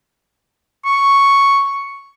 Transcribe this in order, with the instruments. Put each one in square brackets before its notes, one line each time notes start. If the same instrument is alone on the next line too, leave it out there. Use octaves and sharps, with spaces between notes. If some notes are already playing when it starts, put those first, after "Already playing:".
[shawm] C#6